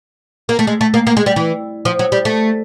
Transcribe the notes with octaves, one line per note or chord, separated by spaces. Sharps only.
A#3
A3
G#3
A3
A#3
A#3
G#3
G3
E3
F3
F#3
G3
A3